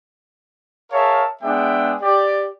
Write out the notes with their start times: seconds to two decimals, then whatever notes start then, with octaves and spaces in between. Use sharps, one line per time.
0.92 G#4 A#4 C#5 E5 F5 A5
1.42 G#3 B3 D4 G#4 E5 G5
2.02 G4 D5